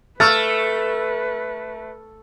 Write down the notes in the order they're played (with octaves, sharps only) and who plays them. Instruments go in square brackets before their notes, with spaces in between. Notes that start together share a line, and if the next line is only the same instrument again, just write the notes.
[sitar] A3 [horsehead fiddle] B4 [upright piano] E6 F6 A6